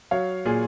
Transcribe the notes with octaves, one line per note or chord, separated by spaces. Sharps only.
F#3 C#5 F5
A#2 F4 G#4